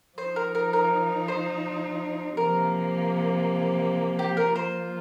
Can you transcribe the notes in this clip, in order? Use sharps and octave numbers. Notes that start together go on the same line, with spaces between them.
F3 D#4 C5
A#4
A#4
A#4
C5
C3 F3 A#3 A#4
G4
A#4
F3 A#3 F4 C5